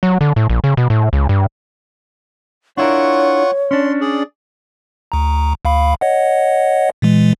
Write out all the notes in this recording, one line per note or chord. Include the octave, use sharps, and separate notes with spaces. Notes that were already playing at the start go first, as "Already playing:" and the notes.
F#3
D3
A2
A#1
C#3
B2
A2
C#2
G2
D4 E4 F4 A#4 C#5 F#5 C#6
C#4 D4 C6
G#4 D5
D2 A#5
D2 F5 B5
C#5 D#5 F#5
A#2 E3 G#3